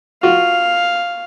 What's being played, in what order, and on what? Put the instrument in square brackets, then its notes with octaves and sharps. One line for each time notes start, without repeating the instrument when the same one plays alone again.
[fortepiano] F4 F#4 [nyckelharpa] F5